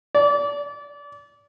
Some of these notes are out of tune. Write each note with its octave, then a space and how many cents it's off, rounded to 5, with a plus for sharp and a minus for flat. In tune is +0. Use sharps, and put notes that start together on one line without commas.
D5 -30